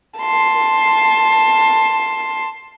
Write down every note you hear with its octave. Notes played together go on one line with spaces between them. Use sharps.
A5 C6